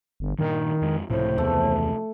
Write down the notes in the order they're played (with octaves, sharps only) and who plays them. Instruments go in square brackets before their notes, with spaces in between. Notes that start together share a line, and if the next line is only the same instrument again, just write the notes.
[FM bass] G1
[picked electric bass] G2 A#2 [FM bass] D#3
[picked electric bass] F2 G#3
[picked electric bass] C#2 C3 F3 [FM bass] A2 [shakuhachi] C5
[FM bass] E2 [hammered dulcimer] A3